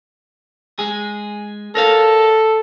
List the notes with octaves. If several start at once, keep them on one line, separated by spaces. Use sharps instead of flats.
G#3 G#4
A4 A#4 C#5 F5